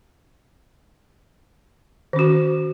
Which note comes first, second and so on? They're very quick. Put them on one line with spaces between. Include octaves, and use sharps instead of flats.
D#3 C#4 F#4